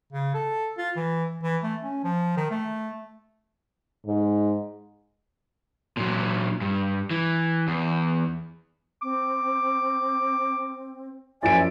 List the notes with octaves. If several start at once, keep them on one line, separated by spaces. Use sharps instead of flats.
C#3
A4
F4
E3
E3
A3
C#4
F3
D#3
A3
G#2
A#2 F#3
G2
E3
E2
C4 D6
F#2 F3 E4 D5 G#5 D7